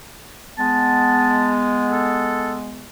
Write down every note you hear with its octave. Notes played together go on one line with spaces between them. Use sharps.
G#3 B3 A5
A4